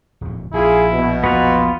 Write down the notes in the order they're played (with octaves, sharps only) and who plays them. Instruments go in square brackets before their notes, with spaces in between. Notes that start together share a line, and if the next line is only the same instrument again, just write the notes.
[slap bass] D1 F2 A#2
[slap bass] A#1 [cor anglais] E4 [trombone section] F4 G#4
[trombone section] B2
[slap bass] A#1 E2 [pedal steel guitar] B3 F4 [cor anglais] F#4